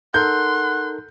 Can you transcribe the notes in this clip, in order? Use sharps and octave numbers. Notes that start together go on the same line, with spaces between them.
D#4 A4 A#4 F#5 C6 G6